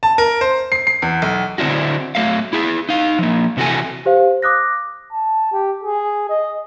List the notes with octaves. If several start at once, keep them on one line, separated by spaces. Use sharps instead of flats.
A5
A#4
C5
C7
C7
E2
B1
D3 C4 D4 E4 F#4
F#3 A3 E5 F5
E4 G#4
D#4 F5
F3 A#3
C3 E3 F#4 A4 G#5
G4 C5 F5
D6 D#6 F#6 A#6
A5
G4
G#4
D#5